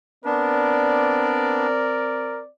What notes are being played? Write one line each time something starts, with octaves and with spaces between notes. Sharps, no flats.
B3 C4 D4 A#4 D5